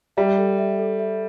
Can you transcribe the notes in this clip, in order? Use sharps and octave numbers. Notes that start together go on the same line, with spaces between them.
G3 E5
A4
E5
A4
E5